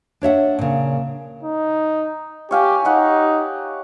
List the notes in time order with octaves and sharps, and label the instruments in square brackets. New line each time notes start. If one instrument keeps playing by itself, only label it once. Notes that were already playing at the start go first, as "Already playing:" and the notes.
[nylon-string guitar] D4 C#5 E5 F#5
A#2 C#3
[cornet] D#4
[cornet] G4 [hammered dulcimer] C#5 F5 G#5
[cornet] D#4 [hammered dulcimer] G4 C#5 F#5